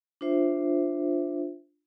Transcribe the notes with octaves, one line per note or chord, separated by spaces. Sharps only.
D4 F4 C5 E5